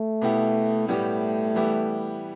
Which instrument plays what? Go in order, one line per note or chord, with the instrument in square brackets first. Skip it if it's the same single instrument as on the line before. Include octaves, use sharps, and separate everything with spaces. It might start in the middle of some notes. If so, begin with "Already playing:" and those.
Already playing: [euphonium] A3
[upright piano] B2 B3 E4 G4
[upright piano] A2 G3 B3 G4 [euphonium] A3
[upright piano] E3 G3 B3 E4 G4